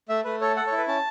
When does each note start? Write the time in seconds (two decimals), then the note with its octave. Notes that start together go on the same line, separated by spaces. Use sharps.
0.09 A3 E5
0.24 A3 B4
0.41 A4 C#5
0.56 A4 F#5
0.67 C#5
0.72 E4
0.77 B4
0.88 C#4 A5